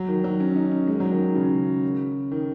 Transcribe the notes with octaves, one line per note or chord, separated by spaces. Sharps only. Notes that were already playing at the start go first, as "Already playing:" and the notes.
Already playing: F#3
D#3
F#3
C#4
D#4
C#4
G#3
F#3
D#3
C#3
D#3